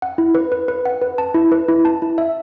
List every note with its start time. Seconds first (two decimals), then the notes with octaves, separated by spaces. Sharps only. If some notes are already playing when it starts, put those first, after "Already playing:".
0.02 F#5
0.18 E4
0.35 B4
0.52 B4
0.68 B4
0.86 F#5
1.02 B4
1.18 A5
1.34 E4
1.52 B4
1.68 E4
1.85 A5
2.02 E4
2.18 E5